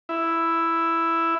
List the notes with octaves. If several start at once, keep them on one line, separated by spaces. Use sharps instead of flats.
E4